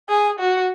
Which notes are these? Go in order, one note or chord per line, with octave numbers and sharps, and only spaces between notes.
G#4 G#5
F#4